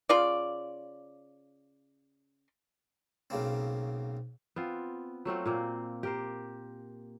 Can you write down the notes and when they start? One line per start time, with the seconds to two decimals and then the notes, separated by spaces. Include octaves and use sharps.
0.09 C#3 F4 D5
3.30 B1 C#3 A#3 C4
4.56 B3 C4 F4
5.25 F#3 A3 C4 F4
5.46 A#2 A#3 C4
6.03 G4 A#4 C5